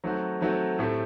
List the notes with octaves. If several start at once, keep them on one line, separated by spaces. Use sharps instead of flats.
D#3 F#3 A3 C4 F#4
D#3 F#3 A3 C4 F#4
A2 A3 C4 G4